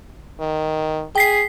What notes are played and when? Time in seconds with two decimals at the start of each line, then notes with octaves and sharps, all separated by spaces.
0.40 D#3
1.15 G#4 G5 B6 C7